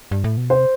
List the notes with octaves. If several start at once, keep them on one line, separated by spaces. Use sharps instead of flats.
G2
A2
B2
C3 C5